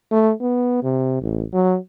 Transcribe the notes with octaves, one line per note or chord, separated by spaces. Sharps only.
A3
B3
C3
A1
F#3